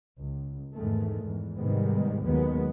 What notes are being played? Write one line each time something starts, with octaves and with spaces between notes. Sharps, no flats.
C#2
E2 G#2 D#3 G#3 A3
E2 G#2
G#2 C3 D#3 G3 G#3 B3
D#2 D#3 F#3 G#3 B3